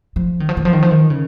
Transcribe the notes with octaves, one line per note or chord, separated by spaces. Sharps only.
F3
D#3
F3
D#3
F3
D#3
F3
D#3
C#3